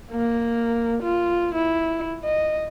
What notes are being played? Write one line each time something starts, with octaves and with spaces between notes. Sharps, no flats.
A#3
F4
E4
D#5